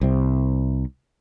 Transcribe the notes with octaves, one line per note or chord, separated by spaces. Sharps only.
C2 C3